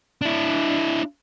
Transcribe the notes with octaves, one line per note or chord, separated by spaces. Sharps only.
D4 E4